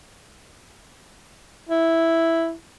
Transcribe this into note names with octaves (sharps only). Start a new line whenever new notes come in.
E4